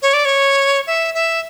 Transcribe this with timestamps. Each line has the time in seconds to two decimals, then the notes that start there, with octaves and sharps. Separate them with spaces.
0.02 C#5
0.14 D5
0.25 C#5
0.87 E5
1.14 E5